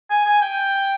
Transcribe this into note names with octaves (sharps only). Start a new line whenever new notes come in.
G#5
G#5
G5